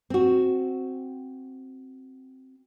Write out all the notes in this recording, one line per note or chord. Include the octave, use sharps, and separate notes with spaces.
C4 F#4